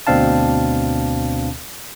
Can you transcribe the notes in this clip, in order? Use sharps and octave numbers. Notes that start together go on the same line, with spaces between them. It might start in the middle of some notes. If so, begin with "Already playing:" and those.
D2 B2 C4 D4 F5 A5